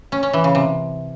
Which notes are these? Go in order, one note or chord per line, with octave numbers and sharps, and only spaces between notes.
C#4
C#4
E3
C#3
C3